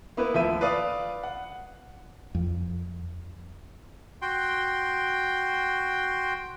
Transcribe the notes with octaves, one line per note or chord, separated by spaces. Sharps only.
A#3 B3 E4 B4
D2 F3 E4 E5 D#7
B4 D5 F5 D#6
F#5
F2
F#4 G5 C6